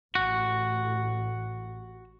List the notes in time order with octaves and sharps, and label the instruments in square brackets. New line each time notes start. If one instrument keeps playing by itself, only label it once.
[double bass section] A1 [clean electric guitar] F#4